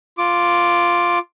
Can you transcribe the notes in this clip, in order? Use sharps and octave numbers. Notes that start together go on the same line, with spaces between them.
F4 D6